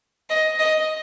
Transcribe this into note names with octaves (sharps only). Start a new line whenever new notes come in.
D#5
D#5